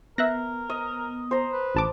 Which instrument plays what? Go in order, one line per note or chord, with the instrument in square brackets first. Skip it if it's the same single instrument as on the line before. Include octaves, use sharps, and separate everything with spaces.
[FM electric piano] B3 [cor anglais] A#4 [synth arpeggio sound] E5 F#6 A#6
[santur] D#5
C5 A#5
[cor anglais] B4
[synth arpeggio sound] A1 A5 D6